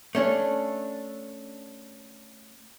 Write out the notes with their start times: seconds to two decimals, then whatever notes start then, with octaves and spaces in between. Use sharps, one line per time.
0.15 A3 C#4 D4